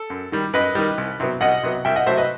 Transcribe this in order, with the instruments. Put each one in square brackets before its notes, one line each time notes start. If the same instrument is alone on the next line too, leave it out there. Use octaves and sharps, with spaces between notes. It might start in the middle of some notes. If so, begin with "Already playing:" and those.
Already playing: [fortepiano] A4
F#2
D#3 G3
F#2 B4 D#5
D#3 G3
C2
C3 F#3 B3
C2 D#5 F#5
C3 F#3 B3
C2 E5 G5
D#5 F#5
C3 F#3 A3 C5 E5
B4 D#5